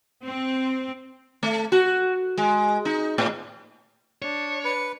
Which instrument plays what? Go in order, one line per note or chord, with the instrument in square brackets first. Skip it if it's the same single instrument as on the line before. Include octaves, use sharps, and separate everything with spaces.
[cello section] C4
[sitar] A3
F#4
G#3
D#4
A2
[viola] D4 [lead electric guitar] C#5
[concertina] B4 [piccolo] C#7